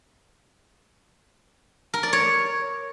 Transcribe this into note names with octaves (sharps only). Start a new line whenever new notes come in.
A#4
D5
C#5